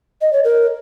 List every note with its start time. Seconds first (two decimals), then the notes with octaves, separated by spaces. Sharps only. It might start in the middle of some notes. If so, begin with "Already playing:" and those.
0.21 D#5
0.33 C#5
0.44 A#4